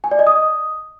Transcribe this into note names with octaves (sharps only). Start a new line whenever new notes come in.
G#5
D5
D#5
D#6